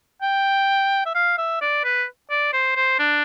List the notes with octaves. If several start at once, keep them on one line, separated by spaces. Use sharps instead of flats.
G5
E5
F5
E5
D5
B4
D5
C5
C5
D4